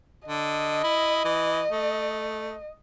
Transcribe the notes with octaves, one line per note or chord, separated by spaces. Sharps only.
D3 D#5
E4
E3
A3